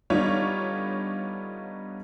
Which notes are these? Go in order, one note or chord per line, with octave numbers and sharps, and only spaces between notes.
D3 G3 B3 D#4 F4 C#5